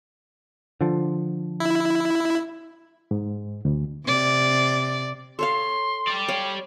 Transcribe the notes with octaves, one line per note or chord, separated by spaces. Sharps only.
D3 F3
E4
G#2
D2
C3 D5
A4 C#5 F5 C6
G4 D5
C#5 F5